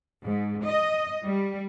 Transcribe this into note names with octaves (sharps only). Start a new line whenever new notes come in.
G#2
D#5
G3